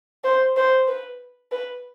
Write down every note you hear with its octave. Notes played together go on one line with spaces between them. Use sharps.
C5
C5
B4
B4